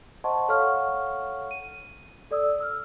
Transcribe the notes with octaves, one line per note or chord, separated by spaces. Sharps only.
C5 D#5 F#5 A5 C6 C#6
A4 C#5 F5 F#5 C#6 F6
D#7
A4 D5 D#6 E6
E6 F6